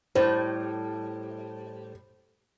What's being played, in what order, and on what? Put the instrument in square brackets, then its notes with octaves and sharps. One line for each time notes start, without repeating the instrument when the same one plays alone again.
[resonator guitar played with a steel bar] A2 G3 [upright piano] C5